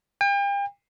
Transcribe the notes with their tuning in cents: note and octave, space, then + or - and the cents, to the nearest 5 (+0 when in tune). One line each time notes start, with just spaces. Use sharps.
G5 +40